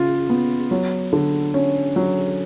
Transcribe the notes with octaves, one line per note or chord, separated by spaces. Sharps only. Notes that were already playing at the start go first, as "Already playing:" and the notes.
Already playing: C#3 F4
B3
F#3
D3
C#4
F#3